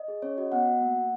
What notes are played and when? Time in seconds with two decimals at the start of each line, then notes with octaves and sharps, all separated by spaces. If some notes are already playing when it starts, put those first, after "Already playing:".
Already playing: D#5
0.08 G#4
0.22 C#4 C#5
0.38 F#4 D#5
0.52 B3 F#5
0.67 F#4
0.81 A#3
0.96 A#3